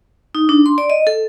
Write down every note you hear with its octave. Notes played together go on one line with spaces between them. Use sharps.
D#4
D4
C6
D5
D#5
A4